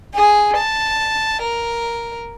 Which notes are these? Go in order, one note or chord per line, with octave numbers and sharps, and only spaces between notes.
G#4
A5
A#4